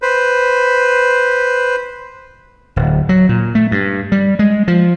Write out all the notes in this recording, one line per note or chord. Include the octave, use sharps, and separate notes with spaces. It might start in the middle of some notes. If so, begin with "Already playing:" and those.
B4 C5
D1
F#3
A#2
A3
G2
G3
G#3
F3